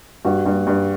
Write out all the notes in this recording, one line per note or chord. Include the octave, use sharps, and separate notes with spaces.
G2 F#4
G2
G2